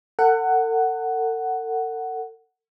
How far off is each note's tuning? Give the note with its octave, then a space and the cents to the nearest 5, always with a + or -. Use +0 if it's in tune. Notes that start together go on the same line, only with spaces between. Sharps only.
A4 +45 F#5 +10